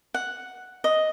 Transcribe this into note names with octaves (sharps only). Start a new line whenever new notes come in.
F#5
D#5